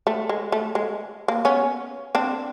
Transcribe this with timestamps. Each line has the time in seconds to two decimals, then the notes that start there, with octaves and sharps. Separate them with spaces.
0.07 A3
0.29 G#3
0.52 A3
0.75 G#3
1.28 A#3
1.45 B3 C#4
2.15 C4 D4